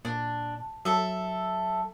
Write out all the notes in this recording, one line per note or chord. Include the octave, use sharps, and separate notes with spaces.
A#2 D4
F#3 A4 E5